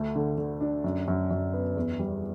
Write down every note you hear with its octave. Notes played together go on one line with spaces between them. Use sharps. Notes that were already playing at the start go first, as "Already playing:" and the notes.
Already playing: D2 A3
D3
D3
D4
F#2
F#2
F#2
B3
E2
G3